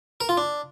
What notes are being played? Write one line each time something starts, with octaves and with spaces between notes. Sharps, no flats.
A#4
F4
D4